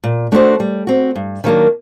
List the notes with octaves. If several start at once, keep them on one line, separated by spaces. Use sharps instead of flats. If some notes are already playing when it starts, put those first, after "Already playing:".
A#2
A3 D4 F#4 C5
G3
C4 F#4
G2
D#3 F#3 A#3 D4